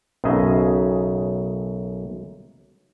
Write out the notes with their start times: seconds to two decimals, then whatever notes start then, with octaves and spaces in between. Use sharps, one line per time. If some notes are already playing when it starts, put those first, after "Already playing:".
0.24 B1 F#2 C#3 G#4 D#5 E5